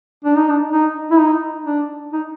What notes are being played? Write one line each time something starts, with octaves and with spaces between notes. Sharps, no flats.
D4
D#4
D4
D#4
E4
D#4
D4
D#4